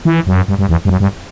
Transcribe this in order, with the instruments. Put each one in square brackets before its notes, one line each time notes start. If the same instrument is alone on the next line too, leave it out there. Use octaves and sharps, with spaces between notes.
[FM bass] E3
F#2
G2
G2
E2
G2
F#2
G2